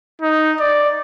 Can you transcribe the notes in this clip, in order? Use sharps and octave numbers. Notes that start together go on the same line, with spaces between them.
D#4
D5